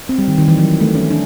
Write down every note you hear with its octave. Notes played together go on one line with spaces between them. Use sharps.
C4
G3
D#3
D#3
E3
F#3
A3
C#4
D4